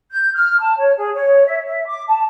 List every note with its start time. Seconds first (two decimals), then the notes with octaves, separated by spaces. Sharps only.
0.11 G6
0.33 F6
0.59 A5
0.76 C#5
0.97 G#4
1.15 C#5
1.45 E5
1.65 E5
1.86 D6
2.07 A5